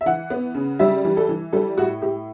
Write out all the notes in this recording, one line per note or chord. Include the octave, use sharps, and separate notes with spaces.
E5
E3 F#5
B3
C#3
G3 E5
E3
A4
E3
G3 A4
A2 F#4
A2 G4